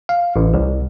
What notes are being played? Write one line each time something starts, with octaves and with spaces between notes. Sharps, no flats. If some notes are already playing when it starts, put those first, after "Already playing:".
F5
A1
C2